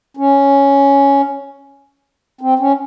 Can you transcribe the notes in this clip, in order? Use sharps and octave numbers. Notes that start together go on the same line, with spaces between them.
C#4
C4
C#4